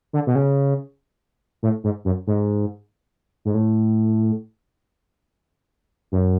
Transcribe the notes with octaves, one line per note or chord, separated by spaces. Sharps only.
D3
B2
C#3
A2
G#2
F#2
G#2
G#2
A2
F#2